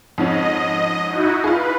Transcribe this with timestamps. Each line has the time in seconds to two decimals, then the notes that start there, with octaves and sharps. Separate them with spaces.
0.18 F2 G#2 C#4 D#5
1.08 D#4 E4 F#4
1.44 F4 G#4 B4